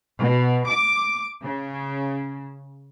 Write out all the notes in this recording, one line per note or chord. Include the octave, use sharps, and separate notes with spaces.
B2
D6
C#3